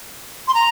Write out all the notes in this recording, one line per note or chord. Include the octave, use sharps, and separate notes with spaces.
C6
A#5